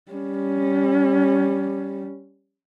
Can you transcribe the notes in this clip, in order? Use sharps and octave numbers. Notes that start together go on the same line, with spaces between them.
G3 C#4